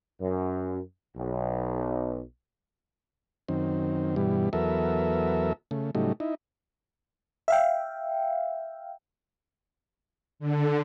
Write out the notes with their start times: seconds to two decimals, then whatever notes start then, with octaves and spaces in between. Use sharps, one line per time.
0.21 F#2
1.17 B1
3.49 F#2 D#3 C4
4.16 G2 B2 E3 G3
4.53 E2 F#3 B3 A4 A#4 E5
5.71 C#3 A3
5.95 A2 C#3 F#3 G3 A3 D#4
6.20 D#4 E4
7.48 E5 F5 G5
10.39 D3